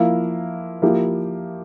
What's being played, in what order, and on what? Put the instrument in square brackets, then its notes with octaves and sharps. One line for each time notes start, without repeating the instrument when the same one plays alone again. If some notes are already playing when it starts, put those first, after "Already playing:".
Already playing: [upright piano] F3 A#3 E4
F3 A#3 E4 G4